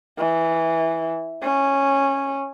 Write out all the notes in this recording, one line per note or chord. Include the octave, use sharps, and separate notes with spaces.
E3
C#4